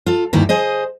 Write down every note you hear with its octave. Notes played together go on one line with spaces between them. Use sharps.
F4 A4
D2 G2 D#3 A#3 E4
G#4 C5 D#5